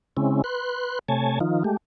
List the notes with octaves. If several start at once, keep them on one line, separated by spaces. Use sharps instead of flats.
C#3 G#3 C4 C#4 E4
B4 C6 F#6
C3 A3 C#5 G#5 A5
D#3 F3 D#4 F4
G#3 A3 G4